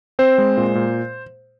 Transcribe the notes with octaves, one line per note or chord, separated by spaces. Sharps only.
C4 C5
G#3
A#2
A#2